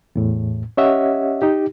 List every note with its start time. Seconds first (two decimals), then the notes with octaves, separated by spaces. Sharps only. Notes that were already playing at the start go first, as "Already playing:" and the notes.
0.16 E2 A2
0.77 C#4 G4 C#5 D#5 E5 F#5
1.42 D#4 G4